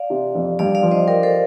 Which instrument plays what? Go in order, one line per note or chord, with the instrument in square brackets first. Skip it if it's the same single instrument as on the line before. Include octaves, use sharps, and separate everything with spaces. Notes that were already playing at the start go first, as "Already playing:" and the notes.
Already playing: [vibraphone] D5 F5
[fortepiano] C3
F2
[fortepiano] G2 [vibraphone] D5 F5
[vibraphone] D5 F5
[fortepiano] F3
[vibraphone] C5 D#5
[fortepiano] G4 [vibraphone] A#4 D5
[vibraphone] A4 C5